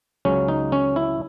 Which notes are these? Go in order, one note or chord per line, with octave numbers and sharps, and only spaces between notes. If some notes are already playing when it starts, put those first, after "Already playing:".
C#2 C#3 F#3 C#4
D#4
C#4
E4